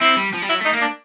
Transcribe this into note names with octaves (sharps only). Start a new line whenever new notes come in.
C4 E4
G3
F3
G3
F#3 E4
A3
D#4
A#3
D4